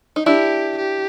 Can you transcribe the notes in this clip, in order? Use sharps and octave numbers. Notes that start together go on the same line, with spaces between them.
D#4
D4 E4 G4
G4